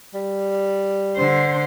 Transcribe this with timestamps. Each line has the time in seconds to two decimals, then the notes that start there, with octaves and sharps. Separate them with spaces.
0.14 G3
1.16 D3 C5